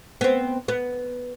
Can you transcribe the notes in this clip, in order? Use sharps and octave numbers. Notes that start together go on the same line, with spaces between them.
B3 C4
B3